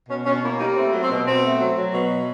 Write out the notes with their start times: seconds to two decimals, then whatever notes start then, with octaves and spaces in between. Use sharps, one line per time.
0.09 B2 C#4
0.25 B2 C#4
0.42 A#3 E4
0.59 G3 D#4
0.76 A3 C4
0.93 F#3
1.01 C4
1.10 B2
1.26 B2 C4
1.44 A3
1.60 F#3
1.77 F#3
1.94 B2